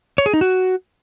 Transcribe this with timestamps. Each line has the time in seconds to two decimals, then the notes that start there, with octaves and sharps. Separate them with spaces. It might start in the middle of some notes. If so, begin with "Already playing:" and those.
0.18 C#5
0.26 G#4
0.34 D#4
0.41 F#4